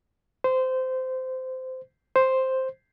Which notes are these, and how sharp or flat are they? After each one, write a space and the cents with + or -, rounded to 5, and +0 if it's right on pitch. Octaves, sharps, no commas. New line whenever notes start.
C5 -20
C5 +0